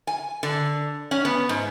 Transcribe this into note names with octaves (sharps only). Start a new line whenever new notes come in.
G#5
D3
C#4
B3
G#2